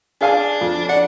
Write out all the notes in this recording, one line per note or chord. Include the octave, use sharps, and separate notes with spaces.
D4 G#4 F5 G#5
F2
D5 F#5